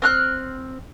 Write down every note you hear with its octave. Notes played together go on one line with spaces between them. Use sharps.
C4 F6 F#6